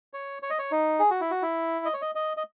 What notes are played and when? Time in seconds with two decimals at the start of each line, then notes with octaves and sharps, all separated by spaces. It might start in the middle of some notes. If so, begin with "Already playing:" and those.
0.13 C#5
0.43 C#5
0.50 D#5
0.59 C#5
0.71 D#4
0.99 G#4
1.10 F#4
1.21 E4
1.31 F#4
1.42 E4
1.85 D#5
1.94 C#5
2.02 D#5
2.15 D#5
2.37 D#5